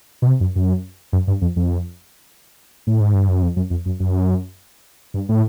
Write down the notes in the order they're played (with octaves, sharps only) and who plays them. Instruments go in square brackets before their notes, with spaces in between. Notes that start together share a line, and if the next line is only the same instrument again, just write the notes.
[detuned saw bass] B2
C3
F#2
F#2
F#2
G2
F2
F2
A2
G#2
G2
F#2
F2
F#2
F2
F#2
F#2
G2
A2